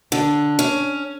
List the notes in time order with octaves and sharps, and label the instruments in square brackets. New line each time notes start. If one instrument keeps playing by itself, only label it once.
[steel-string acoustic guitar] D3 [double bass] D4
[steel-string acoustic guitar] C#4 [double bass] D4